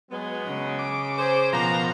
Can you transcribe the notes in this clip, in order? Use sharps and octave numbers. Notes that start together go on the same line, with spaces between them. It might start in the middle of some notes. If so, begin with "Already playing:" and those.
F#3 G#3 B3
C#3
D6
G#4 C5
B2 F3 A#4 C5 A#5